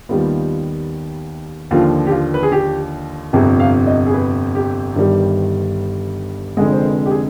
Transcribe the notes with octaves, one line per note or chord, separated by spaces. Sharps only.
D#2 D#3 G3 B3 F4
D#2 D3 F3 F4
G4
F4
B4
G#4
G4
G1 F2 C3 G#4
F5
D#5
G#4
B4
G4
G1 G2 D#3 G3
F1 F2 D3 G#3 G#4
C5
B4
G4
G#4